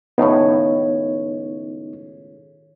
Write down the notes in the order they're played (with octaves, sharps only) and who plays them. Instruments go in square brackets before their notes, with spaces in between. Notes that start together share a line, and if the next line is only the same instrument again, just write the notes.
[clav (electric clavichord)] C#2 A2 [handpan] D#3 C#5 [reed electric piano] B3 D#4